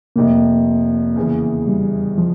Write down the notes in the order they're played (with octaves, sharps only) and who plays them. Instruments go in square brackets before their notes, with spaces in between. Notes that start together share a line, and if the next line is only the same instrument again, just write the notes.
[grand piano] F1 F2 C3 [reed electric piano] A#3
[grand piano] E2 C#3 E3
[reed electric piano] G3
F3